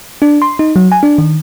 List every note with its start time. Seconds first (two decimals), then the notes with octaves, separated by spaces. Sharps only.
0.22 D4
0.42 C6
0.59 D#4
0.76 F#3
0.92 G#5
1.03 D4
1.18 D#3